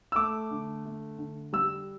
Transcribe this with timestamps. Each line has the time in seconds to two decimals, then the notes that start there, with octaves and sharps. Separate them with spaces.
0.12 E6
0.15 A3 D6
0.51 D3
0.85 A3
1.18 D3
1.53 G3 E6